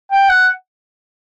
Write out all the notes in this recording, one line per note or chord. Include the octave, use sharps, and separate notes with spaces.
G5
F#5